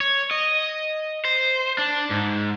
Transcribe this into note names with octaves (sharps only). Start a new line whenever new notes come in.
C#5
D#5
C5
D4
G#2